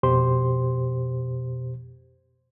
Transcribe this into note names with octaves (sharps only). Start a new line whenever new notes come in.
F2 B2 G4 C5 C6